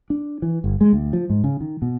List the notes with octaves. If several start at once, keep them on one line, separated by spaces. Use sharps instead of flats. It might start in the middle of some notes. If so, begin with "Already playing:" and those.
D4
E3
G1
G#3
D2
F3
G#2
C#3
D#3
B2